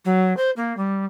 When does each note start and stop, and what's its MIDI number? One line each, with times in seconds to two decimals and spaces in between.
0.05 0.36 54
0.37 0.50 72
0.56 0.75 58
0.77 1.05 55